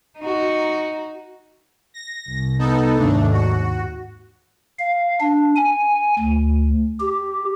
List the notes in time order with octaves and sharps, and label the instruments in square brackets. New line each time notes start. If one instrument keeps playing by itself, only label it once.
[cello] D#4 F#4
[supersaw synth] A#6
[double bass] C2
[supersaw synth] B3 D#4 A4
[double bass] D#2 G#2 [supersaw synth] A3 D4
[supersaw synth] F#4
[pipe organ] F5
D4
G#5
D2
G4